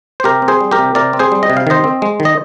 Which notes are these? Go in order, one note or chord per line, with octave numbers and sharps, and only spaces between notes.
C5
C3 G4 A#4
C4
G#4 C5
G3
G4 A#4
C3
C3 A#4 D5
C4
G#4 C5
G3
D#5
C3
F5
D#3 C5 D#5
C4
G#3
D#3
D#5